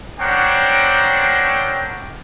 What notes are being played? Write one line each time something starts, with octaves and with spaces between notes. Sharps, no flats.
C4 D4 A#4 C#5 F#5 G5